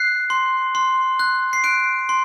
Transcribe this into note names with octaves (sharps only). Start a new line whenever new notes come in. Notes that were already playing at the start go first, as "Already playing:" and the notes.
Already playing: F#6 C7
C6
C6
F#6
C7
F#6 D7
C6